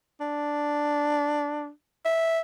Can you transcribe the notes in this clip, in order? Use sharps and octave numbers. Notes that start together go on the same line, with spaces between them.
D4
E5